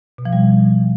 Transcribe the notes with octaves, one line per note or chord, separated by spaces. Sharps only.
B2
F3
G3